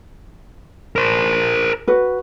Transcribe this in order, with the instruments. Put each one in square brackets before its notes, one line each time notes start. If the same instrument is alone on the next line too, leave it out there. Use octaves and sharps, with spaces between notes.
[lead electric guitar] A#4 C5
[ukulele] F#4 B4